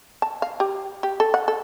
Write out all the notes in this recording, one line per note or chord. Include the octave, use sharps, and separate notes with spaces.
A5
F5
G4
G4
A4
F#5
A4